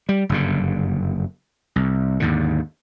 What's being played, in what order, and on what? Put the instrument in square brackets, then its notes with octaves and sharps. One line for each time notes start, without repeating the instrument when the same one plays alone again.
[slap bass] G3
F#1 G2 D3
C2
D#2 G#2 D3